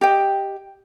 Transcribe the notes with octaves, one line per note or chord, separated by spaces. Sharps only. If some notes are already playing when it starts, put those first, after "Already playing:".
G4 D#5 G5